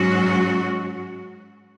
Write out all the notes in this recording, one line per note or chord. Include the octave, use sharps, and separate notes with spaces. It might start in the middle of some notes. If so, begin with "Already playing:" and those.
Already playing: G#2 F#3 C#4 F#4